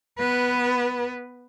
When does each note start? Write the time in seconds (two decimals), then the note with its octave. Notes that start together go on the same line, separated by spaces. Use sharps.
0.19 B3 B4